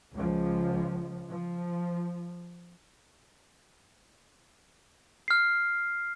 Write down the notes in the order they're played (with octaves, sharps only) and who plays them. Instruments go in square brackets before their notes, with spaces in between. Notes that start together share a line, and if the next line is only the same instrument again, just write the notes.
[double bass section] C#2 F3
F3
[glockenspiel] F6 C7